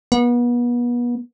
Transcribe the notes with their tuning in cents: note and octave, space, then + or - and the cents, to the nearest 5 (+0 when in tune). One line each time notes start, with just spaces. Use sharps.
B3 -35